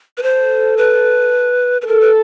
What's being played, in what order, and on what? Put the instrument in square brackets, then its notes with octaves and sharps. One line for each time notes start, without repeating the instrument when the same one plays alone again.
[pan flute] B4
[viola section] A4 [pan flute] C5
[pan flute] B4
B4
[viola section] A4 [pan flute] A#4
[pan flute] B4